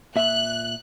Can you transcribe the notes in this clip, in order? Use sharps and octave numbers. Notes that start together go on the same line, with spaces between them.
A#2 E5 F#6